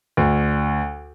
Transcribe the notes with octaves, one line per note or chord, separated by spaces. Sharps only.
D2